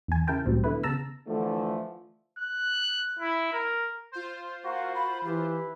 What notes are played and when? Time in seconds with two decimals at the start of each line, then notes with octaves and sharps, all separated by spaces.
0.08 E2 G#5
0.27 C#3 E4 A#4 G5 A5
0.46 C#2 A2 F#3 G3 C4
0.64 D3 A3 B3 E4 B4
0.83 C#3 B3 A5 A#5 E6
1.27 D3 E3 F3 A3
2.39 F#6
3.19 E4
3.53 A#4
4.11 F4 C5
4.64 A#3 F#4 F5
4.94 B5
5.25 E3 E4 G4 B4